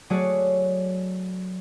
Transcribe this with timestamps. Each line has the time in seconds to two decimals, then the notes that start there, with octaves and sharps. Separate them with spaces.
0.10 F#3 A3 F#4 G#4 C#5 D5